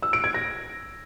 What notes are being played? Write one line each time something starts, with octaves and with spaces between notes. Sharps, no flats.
E6
D7
G#6
A#6